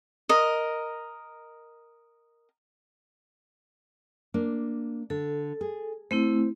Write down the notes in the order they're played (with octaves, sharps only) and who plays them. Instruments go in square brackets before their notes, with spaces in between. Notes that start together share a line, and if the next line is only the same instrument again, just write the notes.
[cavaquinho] A#4 D#5
[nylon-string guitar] A#3 D4
[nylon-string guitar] D3 [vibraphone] A4
[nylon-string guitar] G#4
[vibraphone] A3 C4 E4 [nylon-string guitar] C5